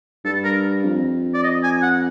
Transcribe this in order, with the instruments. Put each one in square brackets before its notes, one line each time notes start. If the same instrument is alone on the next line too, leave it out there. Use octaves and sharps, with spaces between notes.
[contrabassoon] G2 [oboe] A4
[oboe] A#4
[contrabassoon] F2
[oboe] D5
D#5
G#5
F#5